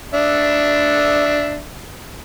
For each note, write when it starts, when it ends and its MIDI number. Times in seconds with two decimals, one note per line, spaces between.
0.14 1.61 62
0.14 1.61 76